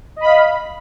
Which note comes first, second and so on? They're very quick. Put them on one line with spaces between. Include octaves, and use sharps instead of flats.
D#5 B5 F5